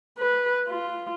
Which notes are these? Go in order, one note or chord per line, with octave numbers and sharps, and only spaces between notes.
B4
F4